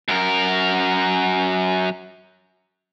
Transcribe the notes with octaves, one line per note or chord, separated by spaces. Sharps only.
F#2 A#4